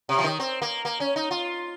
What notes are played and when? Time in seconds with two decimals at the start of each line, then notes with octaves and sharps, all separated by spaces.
0.09 C3
0.18 F3
0.24 D#3
0.40 C4
0.62 A#3
0.85 A#3
1.00 C#4
1.16 D#4
1.31 F4